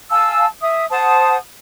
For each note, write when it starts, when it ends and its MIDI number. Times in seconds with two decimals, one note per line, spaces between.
0.10 0.46 77
0.10 0.46 80
0.10 0.46 81
0.10 0.46 88
0.62 0.85 76
0.62 0.85 87
0.91 1.37 72
0.91 1.37 78
0.91 1.37 81
0.91 1.37 87